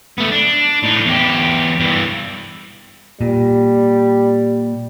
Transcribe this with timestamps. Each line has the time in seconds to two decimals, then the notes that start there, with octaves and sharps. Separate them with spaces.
0.18 A3 B3
0.31 D4
0.83 A2 D#4
1.05 E2 G4
1.80 G2 E3
3.21 A#2 G3